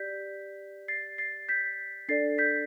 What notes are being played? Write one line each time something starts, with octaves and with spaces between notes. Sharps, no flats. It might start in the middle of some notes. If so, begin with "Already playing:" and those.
Already playing: G4 D5 G6 B6
A6 C7
A6 C7
G6 B6
D4 A4 D5 A6 C7
G6 B6